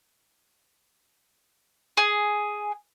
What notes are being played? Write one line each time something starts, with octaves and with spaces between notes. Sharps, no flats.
G#4